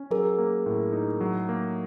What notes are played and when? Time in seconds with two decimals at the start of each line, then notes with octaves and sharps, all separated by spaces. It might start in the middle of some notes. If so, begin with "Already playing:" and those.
Already playing: C#4
0.10 F#3 G#4 A#4
0.38 A#3
0.66 A2
0.93 D#4
1.21 F#3
1.49 A#3